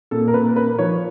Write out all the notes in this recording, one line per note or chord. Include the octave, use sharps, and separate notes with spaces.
A#2 A4
A#4
A#2 B4
A#3 B4
F3 C#5